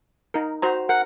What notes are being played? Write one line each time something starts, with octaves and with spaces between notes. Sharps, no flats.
D#4 A#4
F#4 C5 A#5
A#4 F#5